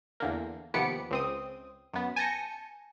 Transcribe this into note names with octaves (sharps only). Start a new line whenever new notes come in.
E2 D3 A#3
D#2 C3 F3 B3 D6 C#7
C#2 C4 D#6
F#2 B3
G#5 A5 G6 A#6 C#7